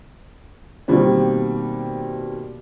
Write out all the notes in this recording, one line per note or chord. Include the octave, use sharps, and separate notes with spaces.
B2 D#3 G3 A#3 C4